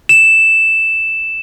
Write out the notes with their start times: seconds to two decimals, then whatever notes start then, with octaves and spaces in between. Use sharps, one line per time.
0.09 E7